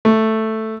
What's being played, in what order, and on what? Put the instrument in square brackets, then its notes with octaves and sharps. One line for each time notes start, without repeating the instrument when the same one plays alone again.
[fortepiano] A3